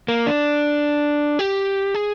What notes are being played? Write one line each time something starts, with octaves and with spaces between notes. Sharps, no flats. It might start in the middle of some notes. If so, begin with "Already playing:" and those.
A#3
D4
G4
G#4